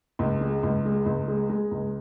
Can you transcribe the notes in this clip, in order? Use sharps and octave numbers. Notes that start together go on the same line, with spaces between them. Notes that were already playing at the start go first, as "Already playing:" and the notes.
C#2
G#3
C#2
G#3
C#2
G#3
G#3
C#2